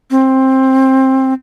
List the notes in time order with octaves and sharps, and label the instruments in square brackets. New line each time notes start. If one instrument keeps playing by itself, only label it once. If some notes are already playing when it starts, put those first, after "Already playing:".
[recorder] C4